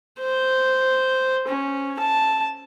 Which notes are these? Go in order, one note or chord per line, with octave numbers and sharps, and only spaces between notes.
C5
C#4
A5